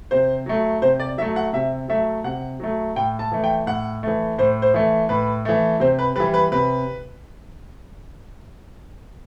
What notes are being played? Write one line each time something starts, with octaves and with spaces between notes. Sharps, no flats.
C3 C5
F#3 A3
C3 C5
D5
F#3 A3 E5
F#5
C3 E5
F#3 A3 E5
C3 F#5
F#3 A3
A2 G5
A5
E3 A3
G5
A2 F#5
E3 A3
A2 C5
C5
E3 A3
A2 B4
E3 A3
C3 C5
B4
E3 G3 B4
B4
C3 B4